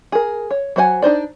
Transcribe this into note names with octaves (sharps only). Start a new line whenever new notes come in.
G#4 A#4
C#5
F#3 F#4 C5 F#5 G#5
D4 D#4 C5 D5